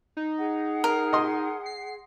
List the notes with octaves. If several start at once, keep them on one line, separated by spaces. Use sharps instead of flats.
D#4
G#4 F#5
A#4
D#5 C6 D#6
C7